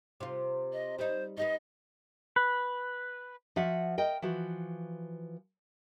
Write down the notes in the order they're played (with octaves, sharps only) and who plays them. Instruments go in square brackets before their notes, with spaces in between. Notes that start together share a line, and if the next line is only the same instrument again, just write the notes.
[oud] C3 F4
[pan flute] D#5
[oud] G3 D#4 [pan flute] C5
[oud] D#4 G4 B4 [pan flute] D#5
[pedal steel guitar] B4
[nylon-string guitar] F3 F#4 E5 F#5
A#4 D#5 G5
E3 F3 F#4